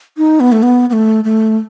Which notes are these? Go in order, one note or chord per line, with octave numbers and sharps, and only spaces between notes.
D#4
B3
A3
B3
B3
A3
A3